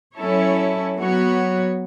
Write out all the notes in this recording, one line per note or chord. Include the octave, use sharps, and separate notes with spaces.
F#3 C#4 E4 A4 C#5
F#3 B3 F#4 C#5